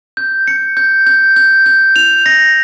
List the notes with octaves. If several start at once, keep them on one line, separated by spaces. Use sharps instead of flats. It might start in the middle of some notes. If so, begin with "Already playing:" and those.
G6
C#7
G6
G6
G6
G6
F7
A#6